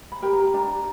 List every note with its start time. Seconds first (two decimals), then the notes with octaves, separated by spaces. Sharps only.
0.12 B5
0.22 G4 A#4
0.33 A#5
0.54 D4 A#5